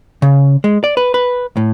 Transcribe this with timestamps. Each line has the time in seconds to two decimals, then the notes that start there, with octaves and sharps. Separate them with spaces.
0.22 C#3
0.64 G#3
0.84 D5
0.97 B4
1.14 B4
1.57 A2